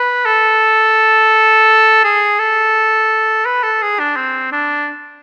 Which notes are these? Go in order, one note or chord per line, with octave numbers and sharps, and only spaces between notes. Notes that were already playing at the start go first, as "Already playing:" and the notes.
Already playing: B4
A4
G#4
A4
B4
A4
G#4
D4
C4
D4